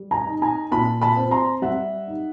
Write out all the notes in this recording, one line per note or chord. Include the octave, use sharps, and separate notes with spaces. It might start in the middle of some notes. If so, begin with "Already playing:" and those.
Already playing: G3
G#5 A#5
D#4
G#5 A#5
A#2 A5 B5
A5 B5
C4
A#5 C6
G3 E5 F#5
D#4